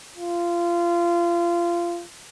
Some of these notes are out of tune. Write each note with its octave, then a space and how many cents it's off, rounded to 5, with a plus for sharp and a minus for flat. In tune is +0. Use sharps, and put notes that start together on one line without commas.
F4 -25